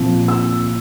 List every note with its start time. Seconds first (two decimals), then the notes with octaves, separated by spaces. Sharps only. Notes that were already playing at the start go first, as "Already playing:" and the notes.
Already playing: A#2 F3 C4
0.28 E6